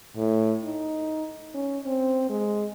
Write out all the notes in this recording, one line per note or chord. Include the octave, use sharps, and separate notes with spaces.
A2
D#4
C#4
C4
G#3